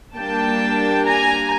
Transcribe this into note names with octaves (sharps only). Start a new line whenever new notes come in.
G3 A#3 D4 G5 A5
G#5 A#5